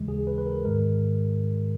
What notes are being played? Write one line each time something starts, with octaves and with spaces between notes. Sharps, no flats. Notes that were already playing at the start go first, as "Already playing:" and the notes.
Already playing: D#2 C#3 E3 G#3
G#4
B4
B4
A#4
G#2 D#3 G#3 A#4